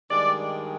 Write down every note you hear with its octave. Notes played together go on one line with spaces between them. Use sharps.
G2 D#3 G#3 D5